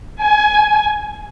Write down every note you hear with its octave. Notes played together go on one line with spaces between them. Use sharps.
G#5